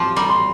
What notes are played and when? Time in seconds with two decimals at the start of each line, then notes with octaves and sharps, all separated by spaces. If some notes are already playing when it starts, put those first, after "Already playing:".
Already playing: F3 C4 G4 C6
0.16 G3 A#5
0.29 C6